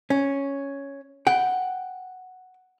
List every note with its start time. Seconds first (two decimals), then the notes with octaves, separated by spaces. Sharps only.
0.10 C#4
1.27 F#5 G5